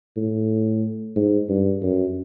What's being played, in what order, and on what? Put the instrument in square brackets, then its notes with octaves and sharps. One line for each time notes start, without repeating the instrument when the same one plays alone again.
[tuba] A2
G#2
G2
F#2